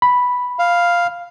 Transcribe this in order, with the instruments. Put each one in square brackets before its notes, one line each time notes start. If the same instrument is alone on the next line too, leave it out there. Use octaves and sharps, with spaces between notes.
[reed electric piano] B5
[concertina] F5